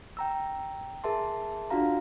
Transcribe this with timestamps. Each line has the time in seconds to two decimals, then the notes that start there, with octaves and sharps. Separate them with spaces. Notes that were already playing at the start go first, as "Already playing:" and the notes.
0.17 G5 A#5 E6
1.04 G#4 A#4 E5 A5 C6
1.70 D4 F4 F#4 F5 A#5